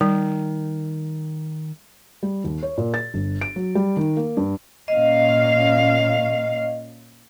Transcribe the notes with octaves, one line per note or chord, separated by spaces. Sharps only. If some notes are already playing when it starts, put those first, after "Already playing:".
D#3 G3
G3
D#2
C#5
A#2
A6
G1
D7
F#3
G3
D#3
A#3
G2
A#2 C#4 D#5 F5